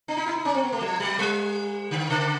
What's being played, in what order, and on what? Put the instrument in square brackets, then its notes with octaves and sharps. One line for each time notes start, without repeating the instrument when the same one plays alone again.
[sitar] D4
D#4
E4
D#4
C#4
C4
B3
A3
F3
F#3
G3
D3
C#3